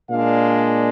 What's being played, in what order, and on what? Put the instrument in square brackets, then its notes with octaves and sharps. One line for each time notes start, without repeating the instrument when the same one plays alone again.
[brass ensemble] A#2 G#3 D4 F5